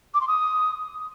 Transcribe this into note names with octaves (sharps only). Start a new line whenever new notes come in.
D6
C6
D#6